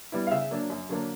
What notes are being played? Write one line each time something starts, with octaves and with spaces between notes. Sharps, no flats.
G3 B3 E4
F5
C#3 E5
F#3 A#3 D4
F#2
D3 F#3 A#3 D4